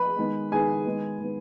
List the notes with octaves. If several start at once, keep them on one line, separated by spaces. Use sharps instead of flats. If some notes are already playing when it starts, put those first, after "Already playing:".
Already playing: B4 B5
D#3 G#3 B3
D#3 G#3 B3 G#4 G#5
D#3 G#3 B3
D#3 G#3 B3